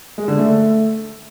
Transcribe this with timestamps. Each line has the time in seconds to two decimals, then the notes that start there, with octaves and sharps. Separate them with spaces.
0.18 G#3
0.28 D3
0.38 A3